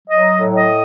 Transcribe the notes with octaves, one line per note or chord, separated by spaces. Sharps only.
F#3 D#5
A2
D#5